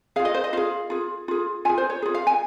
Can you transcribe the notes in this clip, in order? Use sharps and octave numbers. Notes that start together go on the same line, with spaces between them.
F4 G#4 F5
D#5
C5
D#5
F4 G#4 F5
F4 G#4
F4 G#4
F4 G#4 G#5
C5
C#5
F4 G#4
F5
G#5